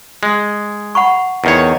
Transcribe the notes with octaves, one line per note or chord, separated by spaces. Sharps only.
G#3
F#5 B5 C#6
E2 D#3 C#5